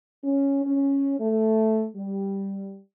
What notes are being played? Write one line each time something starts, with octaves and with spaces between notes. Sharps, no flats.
C#4
C#4
A3
G3